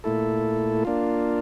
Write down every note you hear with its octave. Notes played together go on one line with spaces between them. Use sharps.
A#2 A3 E4 A4
A#3 D4 F4